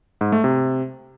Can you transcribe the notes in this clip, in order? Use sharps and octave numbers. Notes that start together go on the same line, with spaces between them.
G#2
A3
C3